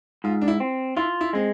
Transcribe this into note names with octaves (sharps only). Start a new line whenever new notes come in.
G#2 F4
D4
E4
C4
E4 F4
E4
G#3 C4